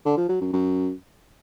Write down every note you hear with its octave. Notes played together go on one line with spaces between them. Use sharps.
D3
F3
F#3
F#2
F#2